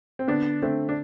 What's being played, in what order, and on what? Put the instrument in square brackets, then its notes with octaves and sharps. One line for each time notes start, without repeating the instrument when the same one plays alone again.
[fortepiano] C4
[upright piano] D3 [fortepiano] B3 D4
[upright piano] D3 [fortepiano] A3 C4
[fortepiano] D4